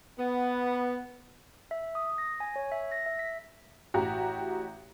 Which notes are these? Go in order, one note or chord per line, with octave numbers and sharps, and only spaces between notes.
B3
E5
D#6
A#6
G#5
C#5
E5
A#6
E5
B6
A1 F#4 G4 A#5